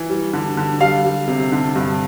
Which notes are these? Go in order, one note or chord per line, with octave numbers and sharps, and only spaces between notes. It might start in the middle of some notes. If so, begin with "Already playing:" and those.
Already playing: E3
G3
D3
D3
G3 F5
G3
C3
D3
G2